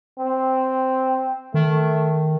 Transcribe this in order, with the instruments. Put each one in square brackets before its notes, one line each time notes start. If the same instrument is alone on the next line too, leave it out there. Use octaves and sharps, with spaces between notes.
[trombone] C4
[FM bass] D#3 [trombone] A3